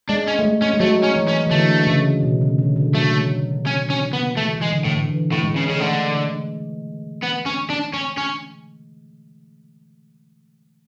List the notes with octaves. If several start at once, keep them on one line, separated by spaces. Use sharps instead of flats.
G#3 D4
C#4
A3
G#3
C#4
G#3
F#3 A3
C#4
E3
C#4
E3
D3 A3
C#3
B2
C#3
D3
D3
F#3 A3
C#4
C#4
B3
E3 A3
E3
G#3
D3
A2
D3
E3
A2
G#3
C#3
C#3
D3 A3
B3
C#4
D4
C#4
C#4